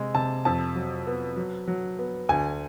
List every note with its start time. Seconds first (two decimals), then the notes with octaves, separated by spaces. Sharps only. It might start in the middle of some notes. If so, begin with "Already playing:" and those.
Already playing: C3 G#3
0.15 C3 A5
0.45 F2 A5
0.76 F#3
1.07 B3
1.36 F#3
1.68 F#3
1.99 B3
2.29 D2 G#5